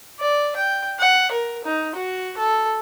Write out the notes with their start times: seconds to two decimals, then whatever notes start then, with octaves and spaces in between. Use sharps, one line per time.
0.20 D5
0.56 G5
0.99 F#5
1.31 A#4
1.64 D#4
1.95 F#4
2.37 A4